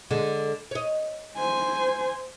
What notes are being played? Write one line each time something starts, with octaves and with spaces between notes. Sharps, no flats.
D3 G#3
C#5 D#5
C5 G#5